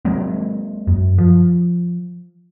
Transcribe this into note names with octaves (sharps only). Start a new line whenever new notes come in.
F#3 G#3 A#3 C4
F#2
F3